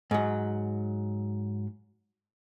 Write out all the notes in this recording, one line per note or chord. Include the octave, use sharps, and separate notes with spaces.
G#2 F#3